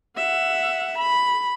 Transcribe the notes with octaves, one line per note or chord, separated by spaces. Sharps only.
E5 F#5
B5